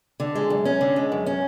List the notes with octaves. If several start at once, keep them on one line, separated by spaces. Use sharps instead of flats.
D3
G#3
F#2
C#4
D3
G#3
F#2
C#4